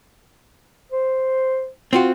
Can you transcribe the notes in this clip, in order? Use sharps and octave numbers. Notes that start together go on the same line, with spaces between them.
C5
C4 F4 F#4